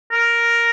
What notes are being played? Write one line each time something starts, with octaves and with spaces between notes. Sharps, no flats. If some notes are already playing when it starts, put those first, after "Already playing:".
A#4